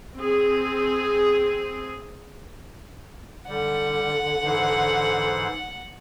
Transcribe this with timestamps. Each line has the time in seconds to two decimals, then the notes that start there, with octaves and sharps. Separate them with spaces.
0.17 C4 G#4
3.48 D3 G3 F#5
4.45 G#2 E3 C5